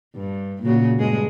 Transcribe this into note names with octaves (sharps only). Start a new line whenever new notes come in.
G2
A#2 C#3 F#4
G2 G#3 G#4